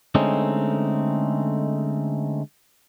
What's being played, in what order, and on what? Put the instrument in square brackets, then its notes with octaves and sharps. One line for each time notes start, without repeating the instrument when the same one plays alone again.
[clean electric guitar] D3 G#3 A3 C4 C#4 D#4